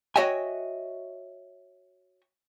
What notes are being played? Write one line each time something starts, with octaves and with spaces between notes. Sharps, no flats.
F#4 C#5 D#5 E5 G5 G#5